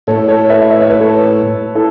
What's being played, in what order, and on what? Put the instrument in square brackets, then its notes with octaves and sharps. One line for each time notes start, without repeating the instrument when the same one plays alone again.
[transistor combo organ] A2 A3 E4 [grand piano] A4 C#5
[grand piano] A4 C#5
B4 E5
E5
C#5
B4
A4 C#5
E4 A4